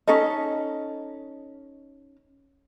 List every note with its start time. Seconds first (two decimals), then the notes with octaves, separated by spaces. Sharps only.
0.08 C#4 D#4 A4 D#5